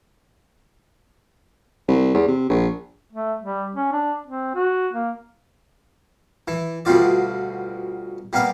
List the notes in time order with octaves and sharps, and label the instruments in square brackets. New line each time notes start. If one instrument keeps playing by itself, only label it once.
[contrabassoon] C2
E2
C3
A#1
[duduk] A3
G3
C#4
D4
C4
F#4
A#3
[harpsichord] E3
D2 B2 G3 F4 D5
G3 A#3 B3 F5